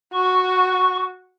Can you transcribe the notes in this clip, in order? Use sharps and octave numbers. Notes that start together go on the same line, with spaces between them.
F#4 C#6